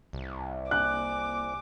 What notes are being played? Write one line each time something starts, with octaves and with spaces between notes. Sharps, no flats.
C2
A#3 G#5 D6 F#6